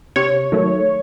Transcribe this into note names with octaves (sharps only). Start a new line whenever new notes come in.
C3 C#5
D#3 F#3 A3